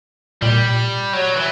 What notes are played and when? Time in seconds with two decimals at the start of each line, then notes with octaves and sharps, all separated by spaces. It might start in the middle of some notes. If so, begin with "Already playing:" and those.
0.42 A#2 G3
1.13 F#3
1.36 E3